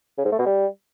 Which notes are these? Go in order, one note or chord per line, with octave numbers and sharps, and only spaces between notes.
C#3
G#2
A3
B2
G3